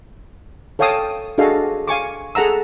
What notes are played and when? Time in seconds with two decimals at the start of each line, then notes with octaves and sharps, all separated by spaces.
0.79 A4 C#5 F5 G5 A5 D#6
1.38 D4 F#4 G#4 A4 D#5 F5
1.88 F5 G#5 C#6 D6
2.35 G#4 A4 F#5 A#5 E6